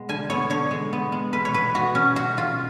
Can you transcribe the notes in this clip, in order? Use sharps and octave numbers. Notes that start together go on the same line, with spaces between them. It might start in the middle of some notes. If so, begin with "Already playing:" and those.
Already playing: B2 G#3 B3
D3 G#5
B3 C#5
D3 C#5
G#3
B3
G#3
B2 B4
C#5
B2 B4
B3 F#4
B2 C#4
G#3 F#4
B2 F4